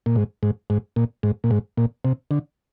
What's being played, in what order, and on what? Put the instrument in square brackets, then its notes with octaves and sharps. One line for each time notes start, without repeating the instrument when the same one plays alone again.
[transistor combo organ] A#2
G#2
G#2
G#2
A#2
G#2
A#2
G#2
A#2
C3
D3